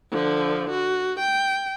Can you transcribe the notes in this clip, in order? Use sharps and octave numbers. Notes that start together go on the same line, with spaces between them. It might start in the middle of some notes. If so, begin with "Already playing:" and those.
D3 F3
F#4
G5